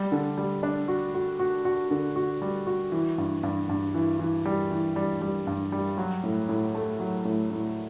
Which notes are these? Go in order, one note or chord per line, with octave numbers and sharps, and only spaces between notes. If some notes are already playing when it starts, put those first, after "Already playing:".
Already playing: G3
D3
G3
D4
F#4
F#4
F#4
F#4
D3
F#4
G3
F#4
E3
G2
G2
G2
E3
E3
G3
E3
G3
G3
G2
G3
F#3
A2
A2
A3
F#3
A2
A2